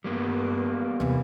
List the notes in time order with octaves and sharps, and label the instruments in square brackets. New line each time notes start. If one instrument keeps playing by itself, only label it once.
[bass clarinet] G2 [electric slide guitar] G3 A#3 B3
[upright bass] D#2 C3 [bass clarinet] E3